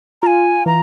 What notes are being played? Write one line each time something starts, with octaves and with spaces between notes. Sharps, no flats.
F4 G#5 A#5
E3 A#5